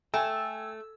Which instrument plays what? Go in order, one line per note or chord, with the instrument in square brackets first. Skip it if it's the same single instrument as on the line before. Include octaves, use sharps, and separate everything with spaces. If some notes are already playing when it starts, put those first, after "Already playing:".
[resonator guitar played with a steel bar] A3 [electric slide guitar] G5 [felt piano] G#5 [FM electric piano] E6